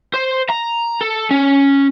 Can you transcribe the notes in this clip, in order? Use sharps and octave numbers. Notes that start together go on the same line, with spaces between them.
C5
A#5
A4
C#4